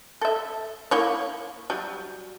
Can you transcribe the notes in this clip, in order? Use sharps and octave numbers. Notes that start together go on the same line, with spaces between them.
A4 E5
A#3 E4 C#5
F#3 G3